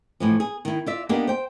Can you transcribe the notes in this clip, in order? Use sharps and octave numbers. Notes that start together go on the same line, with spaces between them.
A2 E3 F3
G#4
D#3 E4
F4 D5 E5
A#3 B3 D4 D#4 G4 A#4
C5 G5